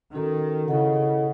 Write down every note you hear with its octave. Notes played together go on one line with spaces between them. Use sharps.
D#3 C#4 F#4 A4
C#3 E4 A4 D#5 F#5